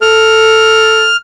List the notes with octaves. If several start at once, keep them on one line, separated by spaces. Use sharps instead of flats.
A4 F6